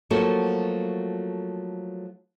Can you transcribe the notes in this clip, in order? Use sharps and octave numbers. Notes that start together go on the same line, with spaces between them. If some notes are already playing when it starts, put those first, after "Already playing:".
F3 F#3 A3 A#3 F#4 A4